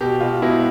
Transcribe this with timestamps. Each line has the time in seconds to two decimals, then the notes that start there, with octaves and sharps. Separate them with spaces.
0.01 B2 G4
0.21 B2 F4
0.42 B2 E4